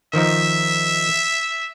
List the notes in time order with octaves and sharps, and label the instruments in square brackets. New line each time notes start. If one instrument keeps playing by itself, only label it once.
[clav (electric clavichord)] D#3 F3 D#4 [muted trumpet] E5